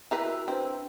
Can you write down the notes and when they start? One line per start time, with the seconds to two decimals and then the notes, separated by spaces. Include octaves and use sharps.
0.11 E4 A#4 B4
0.24 F#4 A#5 E6
0.48 C4 D4 B4 C5